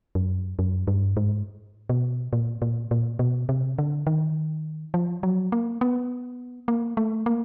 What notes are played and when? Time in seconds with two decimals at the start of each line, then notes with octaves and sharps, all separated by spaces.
0.15 F#2
0.59 F#2
0.87 G2
1.17 G#2
1.89 B2
2.33 A#2
2.62 A#2
2.91 A#2
3.19 B2
3.49 C3
3.78 D3
4.07 D#3
4.94 F3
5.23 F#3
5.52 A#3
5.81 B3
6.68 A#3
6.97 A3
7.26 A#3